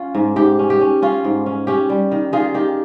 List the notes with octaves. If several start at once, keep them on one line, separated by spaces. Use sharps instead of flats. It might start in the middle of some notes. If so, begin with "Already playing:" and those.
Already playing: C#4 F4
G#2
G#2 G4
C#4
G4
C#4
C#4 F4
G#2
C#4
C#4 G4
G3
D#3
D#3 F4 G#4
D#3 G4